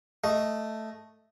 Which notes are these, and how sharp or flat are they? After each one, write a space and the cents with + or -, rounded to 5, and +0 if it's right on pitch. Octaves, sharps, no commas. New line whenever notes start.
A3 +0 D#5 +0